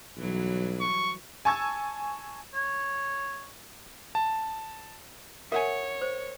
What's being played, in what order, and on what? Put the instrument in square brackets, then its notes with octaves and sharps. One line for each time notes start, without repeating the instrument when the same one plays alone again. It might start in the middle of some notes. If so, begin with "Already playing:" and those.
[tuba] B1 [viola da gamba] E3 F#3 G3
[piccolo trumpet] C#6
[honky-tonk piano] G#5 A5 C#6 E6 G#6
[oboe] C#5
[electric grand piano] A5
[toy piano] A#4 [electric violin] C#5 [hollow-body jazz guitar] E5 F#5 G#5
[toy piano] C5